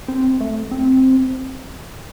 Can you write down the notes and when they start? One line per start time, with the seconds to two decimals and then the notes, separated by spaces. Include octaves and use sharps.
0.08 C4
0.41 A3
0.71 C4